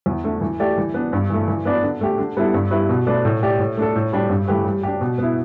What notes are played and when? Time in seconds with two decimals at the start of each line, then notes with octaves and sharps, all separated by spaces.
0.06 E2
0.24 D3 A3
0.41 E3
0.60 A3 G4 D5
0.78 E3
0.94 B3 D4
1.13 G2
1.30 E3 A3
1.48 E3
1.65 B3 D4 B4 D5
1.83 D3
2.01 A3 G4
2.18 D3
2.37 G3 B3 E4 A4
2.54 G2
2.71 G3 E4 B4
2.89 B2
3.07 A3 D4 B4 D5
3.25 A2
3.41 A3 G4 D5
3.59 A2
3.77 A3 D4 A4
3.95 A2
4.13 G3 D4 G4
4.30 G2
4.48 E3 A3 G4 B4
4.65 G3
4.83 D4 G4
5.01 B2
5.18 B3 E4